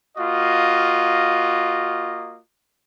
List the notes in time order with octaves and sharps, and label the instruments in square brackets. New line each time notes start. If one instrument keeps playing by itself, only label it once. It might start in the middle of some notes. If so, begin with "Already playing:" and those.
[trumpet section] A#3 F4 F#4 D#5